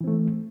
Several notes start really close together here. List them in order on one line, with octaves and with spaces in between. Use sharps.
E3 C4 A3